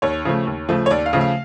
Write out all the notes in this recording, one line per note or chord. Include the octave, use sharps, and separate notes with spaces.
D#2 C#5
C#3 F3 A3
D#2
C#3 F3 A3
C#5
D#2 D5
F5
C#3 F3 A3
F5